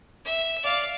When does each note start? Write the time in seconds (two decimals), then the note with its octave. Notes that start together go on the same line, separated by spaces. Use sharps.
0.25 E5
0.63 D5 F5